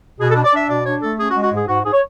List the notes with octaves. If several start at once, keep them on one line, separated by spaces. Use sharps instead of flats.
B2 G#4
A4
D4
D5
D4 E5
B2 D5
D4 C#5
A3 A4
C#4 G#4
F#4
G#3
F#4
G#2 G#4
G#2 F#4
G#2 G#4
C#5